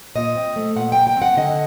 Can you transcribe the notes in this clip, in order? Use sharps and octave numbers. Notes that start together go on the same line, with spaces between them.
A#2 D#5
C4
A3
A#2 F#5
A#2 G5
G5
C4 F#5
D3 D#5